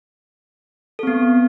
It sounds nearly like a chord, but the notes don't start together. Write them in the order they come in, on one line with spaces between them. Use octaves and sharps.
A4 C4 B3